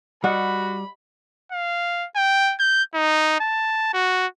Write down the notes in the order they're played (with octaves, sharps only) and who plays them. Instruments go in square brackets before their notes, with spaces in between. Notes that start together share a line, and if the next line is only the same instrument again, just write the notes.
[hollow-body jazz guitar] G3 [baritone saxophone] F#4 [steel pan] D#5 F#5 [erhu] B5
[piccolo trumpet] F5
G5
G6
D#4
A5
F#4